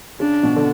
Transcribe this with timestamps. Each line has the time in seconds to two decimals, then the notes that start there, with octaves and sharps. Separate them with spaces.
0.20 C#3 D4
0.43 B2
0.56 D3